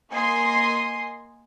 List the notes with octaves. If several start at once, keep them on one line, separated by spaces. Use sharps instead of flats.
A#3 D#5 G#5 C6 D#6 C7